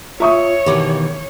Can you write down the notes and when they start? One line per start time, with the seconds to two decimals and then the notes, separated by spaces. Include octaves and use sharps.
0.20 F4 C#5 E5 C#6 D#6
0.66 B2 D#3 E3 G4 D6